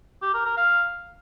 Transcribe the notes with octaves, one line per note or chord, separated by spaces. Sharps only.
G4
A#4
A#4
F5